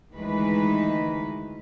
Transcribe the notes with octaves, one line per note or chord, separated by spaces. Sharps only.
D2 D#3 E3 G#3 B4